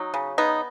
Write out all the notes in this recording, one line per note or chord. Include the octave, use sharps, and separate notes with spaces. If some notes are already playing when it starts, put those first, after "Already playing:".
Already playing: F#3 D#4
C#3
B3 D#4